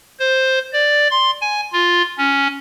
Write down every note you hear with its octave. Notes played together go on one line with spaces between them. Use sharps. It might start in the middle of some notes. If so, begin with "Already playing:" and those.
C5
D5
C6
G#5
F4
C#4